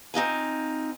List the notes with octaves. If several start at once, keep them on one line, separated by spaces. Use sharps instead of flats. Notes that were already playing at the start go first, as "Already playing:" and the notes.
C4 D#4 F4 G#5